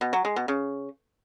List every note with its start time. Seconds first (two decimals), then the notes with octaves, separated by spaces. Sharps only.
0.01 B2
0.13 F#3
0.25 G#3
0.36 B2
0.48 C#3